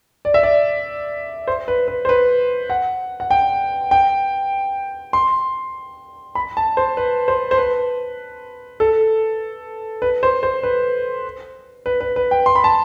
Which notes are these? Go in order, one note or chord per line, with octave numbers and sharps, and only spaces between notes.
D5
E5
D5
C5
B4
B4
C5
B4
F#5
F#5
G5
G5
C6
B5
A5
C5
B4
C5
C5
B4
A4
B4
C5
C5
B4
B4
B4
B4
G5
C6
B5
A5